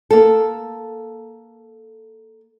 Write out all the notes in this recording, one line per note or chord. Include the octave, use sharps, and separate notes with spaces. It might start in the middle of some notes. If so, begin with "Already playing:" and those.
A#3 A4